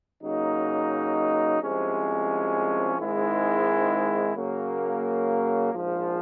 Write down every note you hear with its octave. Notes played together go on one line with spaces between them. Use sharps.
C#3 F#3 A#3 D#4
C2 C3 F3 G#3 C#4
G#2 D#3 G#3 C4 E4
C#3 F#3 A#3
A#1 G#2 F3